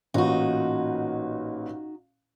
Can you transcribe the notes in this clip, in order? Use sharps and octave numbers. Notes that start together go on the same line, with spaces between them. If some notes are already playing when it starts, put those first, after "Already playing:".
A1 A#2 D#4 F#4